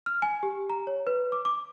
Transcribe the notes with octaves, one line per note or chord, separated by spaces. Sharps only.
F6
G#5
G4
A#5
C#5
B4
D6
D6